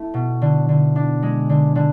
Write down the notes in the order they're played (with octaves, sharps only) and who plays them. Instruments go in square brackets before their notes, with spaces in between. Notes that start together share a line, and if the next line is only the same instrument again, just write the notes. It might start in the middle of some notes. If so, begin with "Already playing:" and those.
Already playing: [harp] A3 E4
B2
D3
D3
D4
G#3
D3
D3